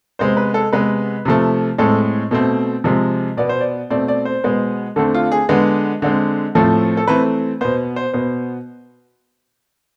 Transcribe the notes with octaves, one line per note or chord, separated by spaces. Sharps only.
C3 G#3 B3 C5
B4
A4
C3 G#3 B3 B4
C3 F3 A3
A2 G#3 C4 A4
B2 A3 C4
C3 F3 G#3
B2 B3 D5
C5
D5
B2 A3 C4 D5
D5
C5
B2 G#3 B3
D3 A3 C4 A4
F4
G#4
D3 G#3 B3
D3 G#3 C4
A2 F3 A3 C4 A4
A4
E3 A3 C4 B4
B2 B3 C5
C5
B2 B3 C5